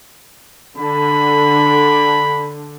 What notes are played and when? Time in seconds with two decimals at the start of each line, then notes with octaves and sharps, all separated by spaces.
0.78 D3 B5